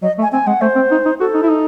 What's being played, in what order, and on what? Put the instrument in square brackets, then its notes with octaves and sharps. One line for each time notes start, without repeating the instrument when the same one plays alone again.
[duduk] F#3 [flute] D#5
[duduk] A3
[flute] G#5
[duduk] C4 [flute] G#5
[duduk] G#3 [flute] F#5
[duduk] A3 [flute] C5
[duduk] C4
D#4
D#4
[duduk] F#4 [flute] A4
[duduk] D#4
E4
D#4